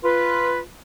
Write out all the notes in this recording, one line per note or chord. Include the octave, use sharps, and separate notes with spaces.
F4 B4